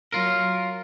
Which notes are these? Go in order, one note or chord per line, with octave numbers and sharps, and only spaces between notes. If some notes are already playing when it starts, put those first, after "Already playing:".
F#3 F4 A#4